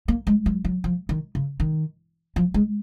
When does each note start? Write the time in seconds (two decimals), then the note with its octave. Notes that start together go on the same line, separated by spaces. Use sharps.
0.08 A#3
0.27 G#3
0.46 F#3
0.65 F#3
0.84 F3
1.09 D#3
1.35 C#3
1.60 D#3
2.36 F3
2.54 G#3